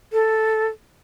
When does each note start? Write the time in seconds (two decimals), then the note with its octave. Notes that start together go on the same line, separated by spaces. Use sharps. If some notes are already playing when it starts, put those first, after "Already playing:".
0.13 A4